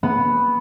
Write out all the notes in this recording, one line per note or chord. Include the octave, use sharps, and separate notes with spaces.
B3